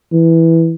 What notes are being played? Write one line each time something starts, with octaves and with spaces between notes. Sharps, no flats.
E3